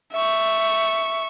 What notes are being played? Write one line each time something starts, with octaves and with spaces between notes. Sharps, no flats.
E5 C#6